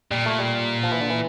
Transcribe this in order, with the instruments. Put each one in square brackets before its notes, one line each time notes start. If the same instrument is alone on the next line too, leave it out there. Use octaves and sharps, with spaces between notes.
[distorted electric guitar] A#2 [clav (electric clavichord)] G3
[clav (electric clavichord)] A3
G3
F3
E3
D3
E3